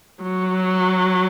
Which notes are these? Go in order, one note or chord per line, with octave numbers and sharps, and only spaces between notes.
F#3